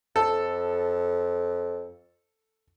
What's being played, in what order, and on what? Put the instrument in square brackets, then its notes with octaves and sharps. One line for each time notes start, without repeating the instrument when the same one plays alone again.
[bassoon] F2 [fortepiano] A4